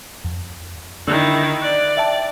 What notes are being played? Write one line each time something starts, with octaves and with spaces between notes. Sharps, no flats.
F2
D3 D#3 D4 E4 E6
D5 F#6
E5 G5 A5